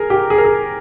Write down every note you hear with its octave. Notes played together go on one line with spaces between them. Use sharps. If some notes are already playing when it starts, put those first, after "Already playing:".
Already playing: G#4 A#4
G4
G#4
A#4
G#4